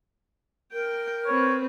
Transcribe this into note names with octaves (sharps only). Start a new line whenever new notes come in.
A#4 G5
C4 B4 C#5